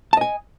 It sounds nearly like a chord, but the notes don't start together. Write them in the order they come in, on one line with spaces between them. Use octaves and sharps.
A5 D#5 G#5